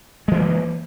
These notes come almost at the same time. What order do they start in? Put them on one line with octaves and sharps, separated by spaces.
G#3 E3 A#3